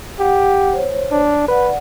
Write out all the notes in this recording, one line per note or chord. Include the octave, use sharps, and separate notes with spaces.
G4 F#5
C5 C#5
D4
B4 D5 F#5